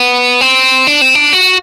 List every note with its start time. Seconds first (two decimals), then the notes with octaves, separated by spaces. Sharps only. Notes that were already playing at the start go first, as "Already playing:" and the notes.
Already playing: B3
0.41 C4
0.87 D4
1.01 C4
1.15 D4
1.33 F#4